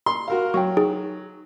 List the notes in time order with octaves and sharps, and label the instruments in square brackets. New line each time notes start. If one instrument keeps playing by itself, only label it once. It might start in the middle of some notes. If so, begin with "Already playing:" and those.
[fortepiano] C6
F#4 A#4 F5
[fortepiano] F#3 [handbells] G5 C#6
[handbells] D#4 G#4